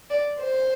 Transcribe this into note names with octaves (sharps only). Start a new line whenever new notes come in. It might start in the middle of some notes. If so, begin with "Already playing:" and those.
D5
C5